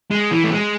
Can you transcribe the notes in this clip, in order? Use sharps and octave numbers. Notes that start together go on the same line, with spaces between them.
G#3
E3
A3
G#3